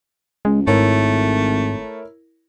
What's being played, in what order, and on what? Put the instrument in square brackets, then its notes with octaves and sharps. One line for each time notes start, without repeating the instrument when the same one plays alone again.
[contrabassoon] C#2 [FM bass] G#3
[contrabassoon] G#1 [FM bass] G#2 [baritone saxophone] A3 [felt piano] E4 A#4 C#5